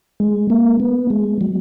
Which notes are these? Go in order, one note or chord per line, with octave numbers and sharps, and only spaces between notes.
G#3
A#3
B3
G#3
F#3